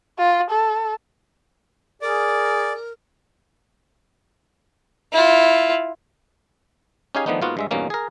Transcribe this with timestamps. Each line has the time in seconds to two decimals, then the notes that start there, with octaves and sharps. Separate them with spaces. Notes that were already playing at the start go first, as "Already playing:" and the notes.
0.18 F4
0.51 A4
2.02 G#4 A#4 D5
5.12 E4 F4
7.15 C#4 D#4 G4 G#4 F5 G#5
7.26 D#3 F3 A3 B3 D4 D#4
7.42 G#2 A#3 B3 F4 F#4
7.57 G2 G#3 E5
7.71 E2 G2 B2 A#3 C#4
7.90 G#4 A#4